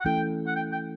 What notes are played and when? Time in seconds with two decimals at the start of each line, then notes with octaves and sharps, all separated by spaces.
0.01 F#5
0.05 E3 A3 C#4 E4 A4 G5
0.47 F#5
0.55 G5
0.72 G5